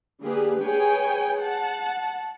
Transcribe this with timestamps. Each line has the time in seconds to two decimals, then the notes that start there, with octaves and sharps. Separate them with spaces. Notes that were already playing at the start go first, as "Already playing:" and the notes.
0.21 D3 A#3 G4 G#4 B4
0.62 G#4 B4 C#5 G5 G#5
1.40 F#5 A5